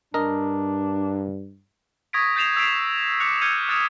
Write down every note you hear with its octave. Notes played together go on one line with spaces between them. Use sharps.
G2 D4 A#4 D#5
C#6 D#6 G#6 A#6 B6 D7
D#6 G6 A6 C7 E7 F7
E6 B6 C7 D7
D6 F#6 B6 C#7 F7
F6 G6 G#6 C#7 D#7 E7
D#6 F#6 A6 C#7 D7 E7